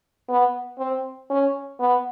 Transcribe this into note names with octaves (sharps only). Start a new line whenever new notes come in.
B3
C4
C#4
B3